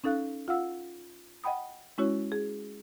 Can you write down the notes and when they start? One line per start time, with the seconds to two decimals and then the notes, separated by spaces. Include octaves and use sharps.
0.04 C#4 D#4 A4 F5 F#6
0.48 F4 F5 F#5 E6
1.44 D#5 F#5 G5 B5 D#6
1.98 G#3 C#4 E4 F#4 C#5
2.32 G#4